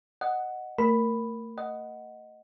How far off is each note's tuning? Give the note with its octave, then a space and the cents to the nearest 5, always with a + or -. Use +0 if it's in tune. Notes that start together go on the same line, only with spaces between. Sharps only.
D#5 -10 F#5 +0
A3 +35 A#4 +0 B5 +0
D#5 +0 F#5 +0